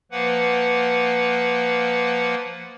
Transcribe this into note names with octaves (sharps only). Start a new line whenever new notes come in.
F3 A#3 B4 F#5